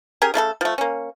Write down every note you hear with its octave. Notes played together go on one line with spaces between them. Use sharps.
C#4 G4 G#4 A#4
C#3 A3 E4 A4
F3 A3
A#3 C#4